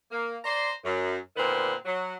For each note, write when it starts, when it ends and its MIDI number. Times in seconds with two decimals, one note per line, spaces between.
0.11 0.36 58
0.45 0.72 72
0.45 0.72 74
0.45 0.72 82
0.45 0.72 84
0.84 1.16 42
1.37 1.74 46
1.37 1.74 50
1.37 1.74 51
1.37 1.74 59
1.37 1.74 60
1.85 2.15 54